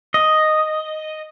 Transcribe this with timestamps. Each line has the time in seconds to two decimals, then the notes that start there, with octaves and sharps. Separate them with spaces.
0.14 D#5